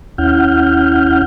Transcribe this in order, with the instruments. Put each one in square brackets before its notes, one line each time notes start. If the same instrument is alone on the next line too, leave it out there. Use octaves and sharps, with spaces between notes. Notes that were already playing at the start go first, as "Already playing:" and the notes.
[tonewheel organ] D#2 C#4 E4 F#5 F6 G6